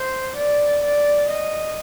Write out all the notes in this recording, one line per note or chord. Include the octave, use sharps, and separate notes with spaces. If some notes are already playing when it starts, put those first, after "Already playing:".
Already playing: C5
D5
D5
D#5